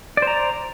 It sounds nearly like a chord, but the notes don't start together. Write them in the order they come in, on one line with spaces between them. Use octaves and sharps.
D5 C5 A#5